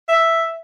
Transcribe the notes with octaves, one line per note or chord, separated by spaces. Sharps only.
E5